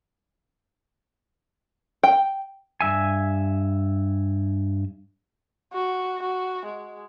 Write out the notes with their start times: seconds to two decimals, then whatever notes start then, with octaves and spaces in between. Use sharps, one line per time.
2.03 G5
2.81 G2 E5 G#5
5.73 F#4
6.22 F#4
6.65 G#3